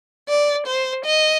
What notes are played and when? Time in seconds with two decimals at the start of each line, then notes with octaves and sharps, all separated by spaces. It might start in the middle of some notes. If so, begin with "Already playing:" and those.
0.29 D5
0.67 C5
1.05 D#5